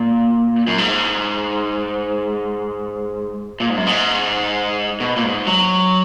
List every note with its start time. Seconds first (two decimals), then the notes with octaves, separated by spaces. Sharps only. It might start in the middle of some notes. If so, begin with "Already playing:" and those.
Already playing: A#2
0.67 F#2
0.78 G#2
3.60 A#2
3.69 G#2
3.77 F#2
3.86 G#2
5.00 B2
5.16 A#2
5.24 G#2
5.47 F#3